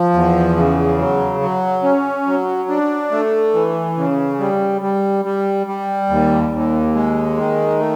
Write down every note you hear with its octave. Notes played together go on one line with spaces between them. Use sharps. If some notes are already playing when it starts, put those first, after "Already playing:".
Already playing: F3
E2
C#3
F#3
F#3
C#4
F#3
D4
A3
E3
C#3
G3
G3
G3
G3
D#2
D#2
G#3
D#3
A3